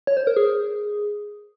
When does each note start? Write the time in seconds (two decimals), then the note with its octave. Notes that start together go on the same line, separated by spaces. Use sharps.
0.07 C#5
0.17 C5
0.27 A#4
0.37 G#4